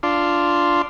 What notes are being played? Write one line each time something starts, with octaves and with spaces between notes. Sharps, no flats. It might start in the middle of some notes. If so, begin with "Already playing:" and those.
D4 F4 C6